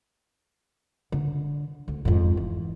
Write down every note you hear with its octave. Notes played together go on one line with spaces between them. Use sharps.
D3
D2
F2 G#2
E3